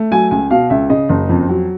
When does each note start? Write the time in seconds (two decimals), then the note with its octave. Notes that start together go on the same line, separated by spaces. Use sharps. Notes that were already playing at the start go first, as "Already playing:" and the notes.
Already playing: A3
0.11 F#3 G#5
0.31 C#2 G#5
0.50 B2 F5
0.70 C#2 E5
0.90 C#3 D#5
1.09 F#1
1.29 F2
1.49 F#3